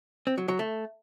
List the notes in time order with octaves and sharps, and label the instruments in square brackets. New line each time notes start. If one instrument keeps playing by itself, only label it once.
[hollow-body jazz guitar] C4
F#3
F#3
A3